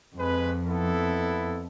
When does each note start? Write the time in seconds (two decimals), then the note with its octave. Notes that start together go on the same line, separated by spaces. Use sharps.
0.17 F2 G#3 B4
0.66 B3 E4 A4